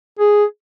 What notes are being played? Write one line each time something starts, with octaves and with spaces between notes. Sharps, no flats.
G#4